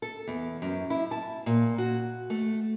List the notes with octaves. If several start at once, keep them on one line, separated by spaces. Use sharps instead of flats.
A4
E2
F#2
E4
A5
A#2
F#4
A3